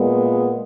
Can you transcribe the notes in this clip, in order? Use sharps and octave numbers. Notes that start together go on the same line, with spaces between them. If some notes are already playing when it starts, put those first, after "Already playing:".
Already playing: A#2 G#3 B3